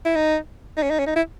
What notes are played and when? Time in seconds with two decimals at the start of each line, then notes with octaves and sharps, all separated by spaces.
0.05 E4
0.16 D#4
0.78 D#4
0.83 C#4
0.90 D#4
0.99 C#4
1.07 D#4
1.16 E4